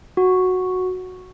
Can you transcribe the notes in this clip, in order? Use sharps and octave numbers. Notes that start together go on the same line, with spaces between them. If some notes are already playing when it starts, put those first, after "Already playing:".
F#4